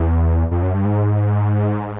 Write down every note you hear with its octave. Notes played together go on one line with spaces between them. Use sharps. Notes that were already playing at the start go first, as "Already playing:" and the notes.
Already playing: E2
F2
F#2
G2
G#2